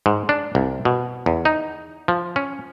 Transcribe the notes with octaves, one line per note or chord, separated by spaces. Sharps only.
G#2
D4
C2
B2
E2
D#4
F3
C#4